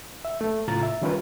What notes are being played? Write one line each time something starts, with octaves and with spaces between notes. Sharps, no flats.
E5
A3
A2 C#3 F4 A#5 A6
E5
D#3 G3 C#4 F4 A#4 B4